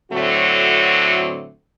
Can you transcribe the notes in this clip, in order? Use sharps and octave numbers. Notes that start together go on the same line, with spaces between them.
A2 D3 F#3 A3 C4 F#4